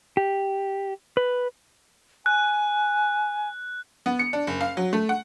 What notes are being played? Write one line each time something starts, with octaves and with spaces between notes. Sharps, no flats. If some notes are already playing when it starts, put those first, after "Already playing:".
G4
B4
G#5 F#6
B3
C#7
D4
F#1
F5
F#3
A3
F#5